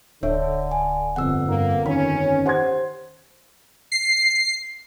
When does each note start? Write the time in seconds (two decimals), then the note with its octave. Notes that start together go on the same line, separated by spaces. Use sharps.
0.23 D1 D3 D4 C#5 E5
0.71 G#5
1.16 G1 F2 F#5 E6
1.48 G2 A#3
1.86 D#3 C#4 B5
2.46 G4 C5 F#5 C6 G#6
3.92 C7